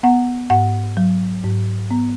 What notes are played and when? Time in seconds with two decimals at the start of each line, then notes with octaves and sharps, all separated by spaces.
0.03 B3 F#5
0.50 G#2 F#5
0.97 F#3
1.44 G#2
1.91 B3